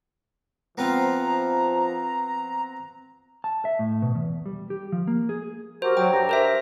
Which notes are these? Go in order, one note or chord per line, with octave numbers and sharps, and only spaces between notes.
F3 B3 C4 F4 A#5
A5
E5
A2
B2
E2
G3
G4
F3
A#3
G#4
F#3 G4 A#4 C5
F#3 G5
G2 G4 A#5
A#4 C5 E5